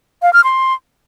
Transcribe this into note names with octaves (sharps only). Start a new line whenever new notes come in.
F5
F6
C6